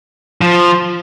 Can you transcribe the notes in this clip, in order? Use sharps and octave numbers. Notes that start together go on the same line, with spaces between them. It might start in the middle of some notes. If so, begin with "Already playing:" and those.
F3